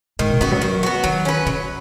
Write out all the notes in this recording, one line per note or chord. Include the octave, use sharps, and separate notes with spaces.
G#2 D#3
B2
C#3 B3 F#4
F#3
D#3 F#3
B3 F#4
D#3 F#3
C#4 B4
C#3 F#3